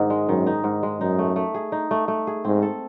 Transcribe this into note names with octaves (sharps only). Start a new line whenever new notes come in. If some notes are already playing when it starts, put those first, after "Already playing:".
Already playing: G#2 D#3 D#4
G#3
F#2 D#3
D#4
G#2
G#3
F#2 D#4
A3
A3
G#4
D#4
A3
A3
G#4
G#2 C4
A4